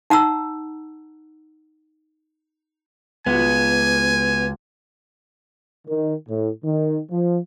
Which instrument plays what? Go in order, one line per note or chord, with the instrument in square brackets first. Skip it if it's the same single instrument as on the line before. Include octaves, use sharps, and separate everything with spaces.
[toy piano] D#4 F#5 A#5 E6
[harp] C#2 F#4 [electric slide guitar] B3 [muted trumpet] G#5
[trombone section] D#3
A2
D#3
F3